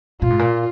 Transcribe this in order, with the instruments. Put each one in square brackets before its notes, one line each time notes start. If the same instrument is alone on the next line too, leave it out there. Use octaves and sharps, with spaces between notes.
[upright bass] A#2 [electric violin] F4
[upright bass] G#2
A#2